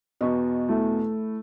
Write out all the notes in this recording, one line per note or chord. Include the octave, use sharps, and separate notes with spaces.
E2 B2 D#5 C#6
A3 E4